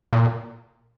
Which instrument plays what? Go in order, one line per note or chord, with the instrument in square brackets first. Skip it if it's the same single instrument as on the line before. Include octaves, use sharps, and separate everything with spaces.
[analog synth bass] A#2